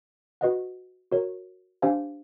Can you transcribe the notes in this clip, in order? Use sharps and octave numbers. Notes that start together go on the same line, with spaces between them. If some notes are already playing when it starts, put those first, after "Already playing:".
F#4 B4 D#5 F#5
F#4 A#4 C#5
D4 G4 C5 F5 G#5